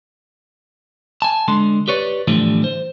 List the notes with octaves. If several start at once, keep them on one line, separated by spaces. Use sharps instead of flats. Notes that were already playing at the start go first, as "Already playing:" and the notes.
G#5 A5
D3 G#3 C6
G4 B4 C#5 D5
A2 D3 E3 F3 G3 A3
C5